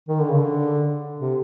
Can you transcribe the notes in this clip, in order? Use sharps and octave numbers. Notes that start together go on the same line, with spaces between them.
D#3
D3
C#3
D3
C3